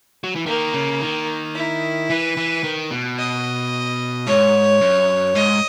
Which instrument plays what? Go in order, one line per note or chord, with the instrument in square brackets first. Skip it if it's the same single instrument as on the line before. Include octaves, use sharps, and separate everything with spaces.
[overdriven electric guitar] F#3
E3
[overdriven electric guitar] D#3 [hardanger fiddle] A#3
[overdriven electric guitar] C#3
D#3
[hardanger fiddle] E4
[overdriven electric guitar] E3 [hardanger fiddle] B4
[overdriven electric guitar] E3
D#3
B2
[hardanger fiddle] D#5
[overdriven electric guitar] G#2 [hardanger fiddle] C#5
[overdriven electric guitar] F#2
[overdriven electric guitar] G#2 [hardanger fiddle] D#5